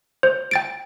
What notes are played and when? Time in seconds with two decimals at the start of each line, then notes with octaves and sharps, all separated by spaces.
0.23 C5
0.51 G5 A6 D7